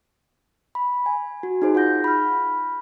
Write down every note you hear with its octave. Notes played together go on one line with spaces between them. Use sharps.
B5
G#5
F#4
D#4 G#4 C5
F4 F#5 G6 A#6
B5 F6